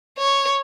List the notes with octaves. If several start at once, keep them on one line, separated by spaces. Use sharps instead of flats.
C#5